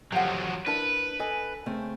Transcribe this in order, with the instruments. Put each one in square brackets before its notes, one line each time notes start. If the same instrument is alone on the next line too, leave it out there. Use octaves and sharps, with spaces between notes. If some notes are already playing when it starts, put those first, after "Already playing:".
[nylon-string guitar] F2 [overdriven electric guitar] F3 F#3 [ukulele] G4 F5 F#5
[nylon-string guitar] D4 [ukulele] E4 A#4 A5 [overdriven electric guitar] B4
[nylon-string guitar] A4 G#5 [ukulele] D#5
[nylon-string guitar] C#3 A3 C4